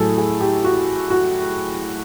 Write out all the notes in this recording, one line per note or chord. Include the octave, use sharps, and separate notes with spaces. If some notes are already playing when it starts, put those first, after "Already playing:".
Already playing: A2 F#3 G#4 A4
G#4
G4
F#4
F#4